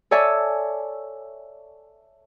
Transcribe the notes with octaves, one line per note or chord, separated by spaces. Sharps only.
A4 C#5 D5 E5 G#5 A5